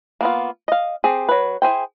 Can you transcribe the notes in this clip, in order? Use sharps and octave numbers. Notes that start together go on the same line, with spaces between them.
A#3 B3 F4
D#5 F5
C4 G4 G#4
F#3 B4
E4 G#4 C5 G5